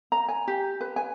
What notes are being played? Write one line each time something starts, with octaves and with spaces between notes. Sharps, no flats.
A#5
G#5
G4
B4
G#5